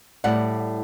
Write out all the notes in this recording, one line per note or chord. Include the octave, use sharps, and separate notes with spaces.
A2 G3 D5 F#5